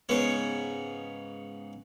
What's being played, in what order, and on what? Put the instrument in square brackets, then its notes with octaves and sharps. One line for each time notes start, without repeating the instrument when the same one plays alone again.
[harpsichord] G#2 C#3 B3 C#5